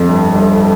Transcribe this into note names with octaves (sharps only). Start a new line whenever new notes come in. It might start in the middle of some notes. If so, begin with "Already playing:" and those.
Already playing: F2
G1
G1